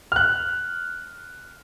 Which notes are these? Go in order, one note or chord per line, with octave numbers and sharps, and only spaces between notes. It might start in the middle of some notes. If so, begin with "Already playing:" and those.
F6 F#6